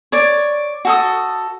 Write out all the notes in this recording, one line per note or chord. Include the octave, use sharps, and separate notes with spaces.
C#5 D5
F#4 A4 D#6